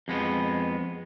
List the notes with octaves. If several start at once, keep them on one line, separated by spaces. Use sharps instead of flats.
F2 G#3 B3